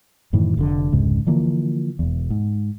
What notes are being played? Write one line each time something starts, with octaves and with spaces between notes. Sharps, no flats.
F#2 A2 D#3 E3
F1 B2 D3
F1 C#2 G#2 C#3
D3 E3 F3 A#3
E1 E2
G#2